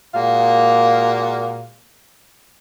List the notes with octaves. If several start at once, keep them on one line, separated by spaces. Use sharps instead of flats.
A#2 G#3 A#3 F#4 F5